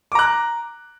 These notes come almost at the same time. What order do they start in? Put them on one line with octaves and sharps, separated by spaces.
D6 A#5 F#6